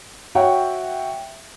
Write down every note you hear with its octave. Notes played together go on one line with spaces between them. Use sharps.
F#4 C#5 E5 F#5 G5